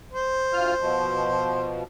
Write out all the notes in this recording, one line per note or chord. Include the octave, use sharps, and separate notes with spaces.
C5
D2 F4 F6
B2 F3